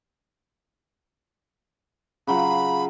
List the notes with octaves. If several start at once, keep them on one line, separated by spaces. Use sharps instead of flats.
C#3 F#3 F4 B5